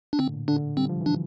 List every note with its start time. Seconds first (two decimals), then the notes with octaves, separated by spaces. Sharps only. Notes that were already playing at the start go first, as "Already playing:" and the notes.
0.13 D4
0.19 D3 C4
0.28 A2
0.34 A#2
0.48 D3 D4
0.77 G3 C4
0.89 F3
1.01 E3
1.06 D4